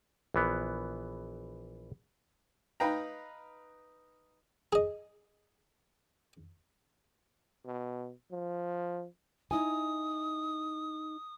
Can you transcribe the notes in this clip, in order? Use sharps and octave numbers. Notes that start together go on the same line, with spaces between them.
A#1 E3 B3
D#4 B4 F5 G5 A#5
G#4 D#5
B2
F3
D#4 E4 G#5 D#6